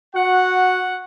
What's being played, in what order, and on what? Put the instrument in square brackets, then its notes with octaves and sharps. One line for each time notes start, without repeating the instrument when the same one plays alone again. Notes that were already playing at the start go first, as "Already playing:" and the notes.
[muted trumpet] F#4 [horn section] F#5